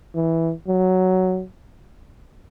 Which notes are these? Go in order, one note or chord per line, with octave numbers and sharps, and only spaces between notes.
E3
F#3